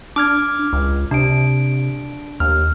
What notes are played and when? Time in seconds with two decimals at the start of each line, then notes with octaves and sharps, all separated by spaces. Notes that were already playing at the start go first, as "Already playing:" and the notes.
0.16 D4 D6 F6 G#6
0.73 C#2
1.11 C3 D4 D7
2.40 D#2 F6